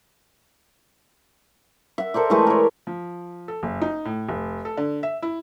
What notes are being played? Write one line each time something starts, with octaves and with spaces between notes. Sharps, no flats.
E5 F#5
A4 A#4 C5 D5
E3 G#3 A3 B4
A#4 C#5
F3
A4
F#1
D#4
A2
F1
A4
D3
E5
E4